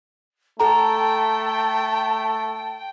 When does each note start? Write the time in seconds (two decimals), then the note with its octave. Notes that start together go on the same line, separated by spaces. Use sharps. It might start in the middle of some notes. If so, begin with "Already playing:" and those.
0.60 A3 A4 G5 A5 A#5